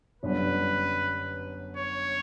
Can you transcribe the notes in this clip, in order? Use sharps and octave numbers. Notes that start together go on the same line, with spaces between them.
G1 F#2 D3 G3 B4
C#5